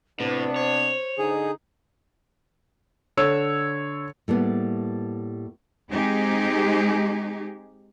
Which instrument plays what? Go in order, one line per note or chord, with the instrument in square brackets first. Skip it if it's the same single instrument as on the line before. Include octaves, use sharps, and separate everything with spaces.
[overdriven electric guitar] A2 [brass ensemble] C3 B3 D4 [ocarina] B4
[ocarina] C5 [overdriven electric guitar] C#5
[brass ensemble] D3 D#4 [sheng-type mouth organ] G#4
[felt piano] D3 C#5 E6
[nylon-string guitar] A2 G3 A#3 B3
[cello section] G#3 C4 D#4 G4 G#4